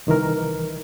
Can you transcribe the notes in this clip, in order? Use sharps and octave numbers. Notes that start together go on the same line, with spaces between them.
C2 D#3 E3 A#4